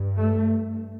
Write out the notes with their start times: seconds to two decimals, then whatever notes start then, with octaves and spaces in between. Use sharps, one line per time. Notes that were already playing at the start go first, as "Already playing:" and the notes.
Already playing: G2
0.18 A3